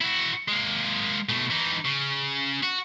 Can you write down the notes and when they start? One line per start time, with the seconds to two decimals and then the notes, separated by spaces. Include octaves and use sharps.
0.01 E4 F#4
0.49 G#3 A#3
1.29 B2 A3
1.50 E3 D#4
1.85 C#3
2.63 F#4